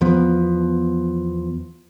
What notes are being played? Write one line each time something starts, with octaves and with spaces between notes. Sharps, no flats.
E2 F3 B3